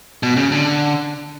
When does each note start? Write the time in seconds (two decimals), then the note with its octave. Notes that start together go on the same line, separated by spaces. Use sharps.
0.23 B2
0.37 C#3
0.52 D3